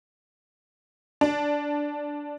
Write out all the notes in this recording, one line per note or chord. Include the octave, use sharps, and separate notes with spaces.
D4